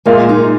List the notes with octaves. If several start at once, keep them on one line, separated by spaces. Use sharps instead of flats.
A#2 G#3 A#3 F4
D#4